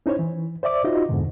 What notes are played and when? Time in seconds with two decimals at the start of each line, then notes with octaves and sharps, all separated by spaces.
0.06 C#4 D#4 E4 C5 C#5
0.19 E3
0.63 C5 D5 E5 D6
0.84 D#4 F4 F#4 D#5
1.09 F2 G#2 B2 D3